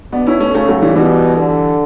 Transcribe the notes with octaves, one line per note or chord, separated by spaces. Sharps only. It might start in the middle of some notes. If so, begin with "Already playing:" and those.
B2 B3 D4
C#4 E4
A3 C#4
C#3 A3 C#4
F#3 A3
E3 G3
B2 E3 G3
D3